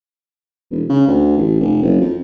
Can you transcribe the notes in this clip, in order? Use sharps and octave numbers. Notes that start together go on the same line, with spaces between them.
E1
C#3
D2
A1
F1
F#1
F2